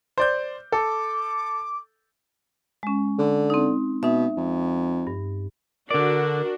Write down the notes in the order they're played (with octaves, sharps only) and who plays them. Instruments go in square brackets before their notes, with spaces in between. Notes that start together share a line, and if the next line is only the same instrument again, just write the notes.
[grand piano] C5 D5 G6
[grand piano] A4 [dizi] D6
[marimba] G#3 C#4
[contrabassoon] D3
[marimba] C4 D#4
[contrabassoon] B2 [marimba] D#4 E5
[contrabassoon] F2
[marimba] G2
[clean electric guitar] D3 D5 [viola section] D4 F#4 [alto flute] A#4